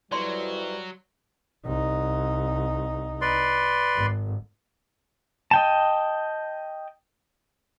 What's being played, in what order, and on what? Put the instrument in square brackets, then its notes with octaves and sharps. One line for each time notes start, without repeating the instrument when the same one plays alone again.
[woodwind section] F2 E3 [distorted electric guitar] F#3 [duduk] G3 [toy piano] C#5 D5 C6
[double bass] C2 D#4
[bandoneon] B4 D5 C6
[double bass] G#1
[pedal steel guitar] D#5 G5 A5